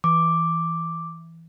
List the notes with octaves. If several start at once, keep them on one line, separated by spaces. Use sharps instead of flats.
E3 D6